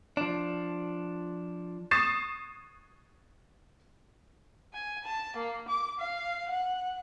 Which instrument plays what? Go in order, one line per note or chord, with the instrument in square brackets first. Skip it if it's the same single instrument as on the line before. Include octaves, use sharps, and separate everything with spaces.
[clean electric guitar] F3 D4
[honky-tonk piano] C#6 D#6 A6 C7 E7
[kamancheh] G#5
A5
A#3
D6
F5
F#5